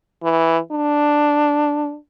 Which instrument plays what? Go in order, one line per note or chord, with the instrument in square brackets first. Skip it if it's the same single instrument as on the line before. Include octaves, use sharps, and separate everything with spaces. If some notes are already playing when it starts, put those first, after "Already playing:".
[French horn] E3
D4